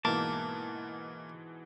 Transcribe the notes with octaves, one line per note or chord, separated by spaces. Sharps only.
G#2 B2 E3 A#3 A5 D6